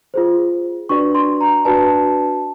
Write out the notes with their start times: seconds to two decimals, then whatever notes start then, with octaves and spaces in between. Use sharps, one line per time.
0.14 F4 G#4 C5
0.89 D4 F#4 B4 D5 C#6
1.15 C6
1.41 A#5
1.65 D4 F#4 B4 D5 A5